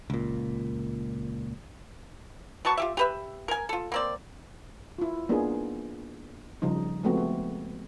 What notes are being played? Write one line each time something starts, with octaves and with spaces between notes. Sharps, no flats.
C#2 A#2
F#3 B3 A5 C#6
F4 G4 E5
G4 B4 E5
A#4 G#5
F4 A4
A#3 C4 D5
E4 F4
A#3 B3 D4 D#4 F4 G#4
C#3 F3 G3 D#4
F3 G#3 A3 B3 C4 F#4
B3